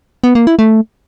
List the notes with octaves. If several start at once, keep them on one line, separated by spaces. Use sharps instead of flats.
B3
A#3
E4
A3